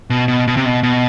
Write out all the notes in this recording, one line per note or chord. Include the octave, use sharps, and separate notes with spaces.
B2
B2
B2
C3
B2
B2